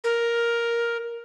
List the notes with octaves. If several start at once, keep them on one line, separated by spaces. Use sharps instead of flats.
A#4